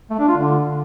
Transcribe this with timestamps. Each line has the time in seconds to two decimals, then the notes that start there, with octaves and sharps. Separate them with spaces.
0.10 A3
0.19 D4
0.28 F4
0.37 D3